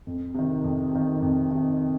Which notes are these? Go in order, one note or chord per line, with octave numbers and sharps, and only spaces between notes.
F2
C3 D#3
F2
C3 D#3
F2
C3 D#3